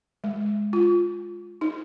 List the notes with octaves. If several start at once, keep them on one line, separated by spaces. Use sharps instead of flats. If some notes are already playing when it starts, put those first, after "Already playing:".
G#3
F4
D#4